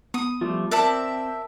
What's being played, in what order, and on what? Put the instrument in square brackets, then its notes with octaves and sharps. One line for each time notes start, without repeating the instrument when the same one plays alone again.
[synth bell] B3 [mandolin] D#6
[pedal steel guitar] F3 G3 A3 [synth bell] F4
[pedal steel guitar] C4 [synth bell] A#4 [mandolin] D5 E5 A5